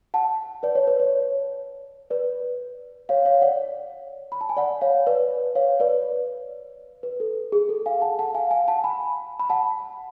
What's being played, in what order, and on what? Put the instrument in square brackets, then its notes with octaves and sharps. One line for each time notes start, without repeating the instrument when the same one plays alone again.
[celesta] F#5 A5
B4 D5
C#5
B4
C#5
B4 D5
C#5 F5
C#5 F5
D5 F#5
B5
A5
G#5
D5 F#5
C#5 F5
B4 D5
C#5 F5
B4 D5
B4
A4
G#4
A4
F5 G#5
F#5 A5
F#5 A5
F5 G#5
F5 G#5
F#5 A5
G#5 B5
B5
F#5 A5